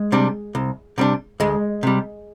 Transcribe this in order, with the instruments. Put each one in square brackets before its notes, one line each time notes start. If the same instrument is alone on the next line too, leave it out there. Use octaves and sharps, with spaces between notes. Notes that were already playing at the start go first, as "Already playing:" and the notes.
Already playing: [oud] G#3
[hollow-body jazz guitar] C3 G3 D4
C2
C3 G3 D4
[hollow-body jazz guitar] D2 [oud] G#3
[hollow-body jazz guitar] C3 G3